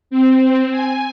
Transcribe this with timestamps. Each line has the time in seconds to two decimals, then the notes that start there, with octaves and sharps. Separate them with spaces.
0.11 C4
0.71 G#5